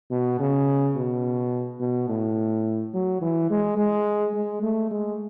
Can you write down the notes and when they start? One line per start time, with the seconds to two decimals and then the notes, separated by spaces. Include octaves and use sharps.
0.11 B2
0.40 C#3
0.97 B2
1.81 B2
2.09 A2
2.94 F#3
3.22 E3
3.50 G#3
3.78 G#3
4.35 G#3
4.63 A3
4.91 G#3